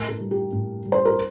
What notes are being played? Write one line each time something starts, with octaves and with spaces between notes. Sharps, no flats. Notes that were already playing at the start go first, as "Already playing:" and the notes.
Already playing: A2 A#4
A4
G3
G4
A2
G3
C5
A#4